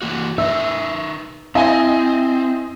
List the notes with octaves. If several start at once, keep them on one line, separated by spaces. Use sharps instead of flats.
E3 A#3 F#4
D#4 A#4 B4 E5 E6
C4 E4 D#5 E5 G#5